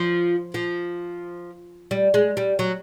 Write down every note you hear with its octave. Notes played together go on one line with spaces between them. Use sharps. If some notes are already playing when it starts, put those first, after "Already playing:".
Already playing: F3
F3
G3
G#3
G3
F#3